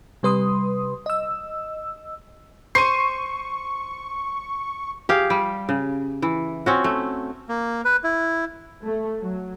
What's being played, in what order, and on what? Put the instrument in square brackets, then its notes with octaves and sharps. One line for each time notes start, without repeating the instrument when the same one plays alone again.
[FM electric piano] C3 G3 B4 C6 D#6
D#5 E6
[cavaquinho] C5 [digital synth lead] C#6 [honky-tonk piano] C7 D#7
[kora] G4 G#4 F5
G3
C#3
E3
C4 C#4 F#4
A3
[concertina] A#3
B4
E4
[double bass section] A3
F#3